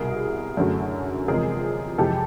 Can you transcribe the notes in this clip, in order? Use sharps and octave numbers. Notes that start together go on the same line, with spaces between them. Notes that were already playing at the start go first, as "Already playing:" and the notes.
Already playing: C2 B2 G3 G#4 A#4
F#2 D3 F#3 A3
E2 C3 F3 G#3 G#4 A#4
F2 C3 E3 G#3 G4 A4